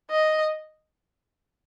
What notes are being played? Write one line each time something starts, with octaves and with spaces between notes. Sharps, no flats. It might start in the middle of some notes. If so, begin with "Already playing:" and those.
D#5